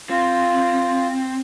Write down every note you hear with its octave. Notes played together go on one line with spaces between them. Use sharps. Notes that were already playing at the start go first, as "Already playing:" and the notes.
C4 F4